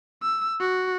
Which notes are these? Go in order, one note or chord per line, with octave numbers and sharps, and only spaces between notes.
E6
F#4